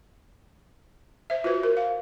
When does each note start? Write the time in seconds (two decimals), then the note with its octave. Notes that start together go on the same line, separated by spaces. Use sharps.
1.30 C5 E5
1.44 F4 F#4 B4 C5
1.63 A#4
1.77 F5